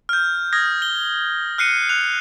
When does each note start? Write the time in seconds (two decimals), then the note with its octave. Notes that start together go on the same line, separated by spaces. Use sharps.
0.09 F6 G6
0.53 D#6 F6 G#6 A#6
0.82 G7
1.58 F6 F#6 C7 C#7 D#7
1.89 F#6 F7